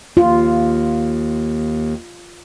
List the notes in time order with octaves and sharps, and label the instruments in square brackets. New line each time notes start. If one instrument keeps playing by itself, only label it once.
[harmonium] D#2 [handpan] F4